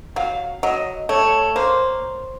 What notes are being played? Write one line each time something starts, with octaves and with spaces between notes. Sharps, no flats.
F#3 F5
F#3 D#5
A3 C#5
A#3 C5